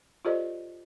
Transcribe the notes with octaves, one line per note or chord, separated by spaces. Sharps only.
F4 G4 A4 C5 D5 D#5